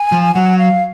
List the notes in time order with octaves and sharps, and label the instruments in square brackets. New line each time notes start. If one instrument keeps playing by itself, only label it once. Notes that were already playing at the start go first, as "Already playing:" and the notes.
Already playing: [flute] G#5
[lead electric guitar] F3
[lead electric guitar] F#3 [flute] F#5
[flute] F5